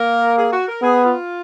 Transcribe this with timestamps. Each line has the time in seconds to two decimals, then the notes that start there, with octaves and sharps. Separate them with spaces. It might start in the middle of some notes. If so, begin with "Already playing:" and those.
Already playing: A#3 A#4
0.38 G#4
0.53 F#4
0.68 A#4
0.82 B3 G#4
1.05 F4